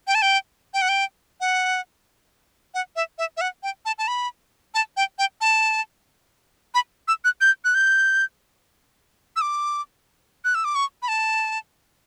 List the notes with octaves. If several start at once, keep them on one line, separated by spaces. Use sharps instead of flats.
G5
A5
G5
G5
F#5
G5
F#5
F#5
E5
E5
E5
F#5
G5
A5
A5
B5
A5
G5
G5
A5
B5
E6
F#6
G6
F#6
G6
E6
D6
F#6
E6
D6
C#6
B5
A5